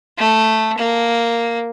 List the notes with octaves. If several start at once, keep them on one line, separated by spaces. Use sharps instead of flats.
A3
A#3